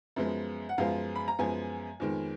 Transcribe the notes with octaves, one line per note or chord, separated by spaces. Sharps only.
F#2 F3 G#3 B3
F#5
F#2 F3 G#3 B3 F5
B5
A#5
F#2 F3 G#3 B3 G#5
F2 D#3 G#3 B3